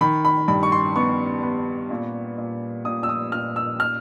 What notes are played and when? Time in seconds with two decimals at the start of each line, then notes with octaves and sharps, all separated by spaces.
0.01 D#3 B5
0.25 B5
0.48 G2 B5
0.63 C#6
0.72 C6
0.96 B3 C#6
1.43 B3
1.91 A#2
2.38 A#2
2.85 A#2 D#6
3.03 E6
3.09 D#6
3.32 A#2 F6
3.56 E6
3.80 F6